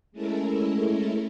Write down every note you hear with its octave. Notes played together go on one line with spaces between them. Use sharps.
G#3 A3 C#4 E4 A4 A#4